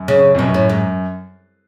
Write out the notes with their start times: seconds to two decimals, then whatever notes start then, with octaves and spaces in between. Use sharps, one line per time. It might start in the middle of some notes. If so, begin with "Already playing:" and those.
Already playing: F#2
0.08 C#3
0.35 F2
0.39 F#2 B2
0.54 A2
0.69 G#2